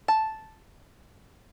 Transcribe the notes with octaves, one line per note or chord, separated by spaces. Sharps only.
A5